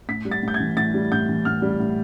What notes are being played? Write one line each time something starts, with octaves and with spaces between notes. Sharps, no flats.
A2 B6
G3
A6
A2 G6
G#6
E3
A2 A6
G3
A2 G6
E3
A2 F6
G3
A2